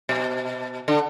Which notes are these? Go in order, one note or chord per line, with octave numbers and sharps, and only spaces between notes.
B2
D3